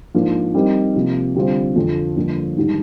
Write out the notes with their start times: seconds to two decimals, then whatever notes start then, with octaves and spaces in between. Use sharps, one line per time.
0.14 G#2 F3 A#3 D4
0.54 G3 C4 D#4 G4 A#4
0.96 C3 F3 A#3
1.35 D3 G3 C4 F4 C5
1.76 F2 D3 F3
2.16 G2 D3 F3 A#3
2.57 G#2 D#3 G3 D4